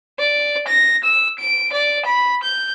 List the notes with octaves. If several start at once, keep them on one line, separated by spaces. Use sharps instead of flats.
D5
A#6
E6
D7
D5
B5
G6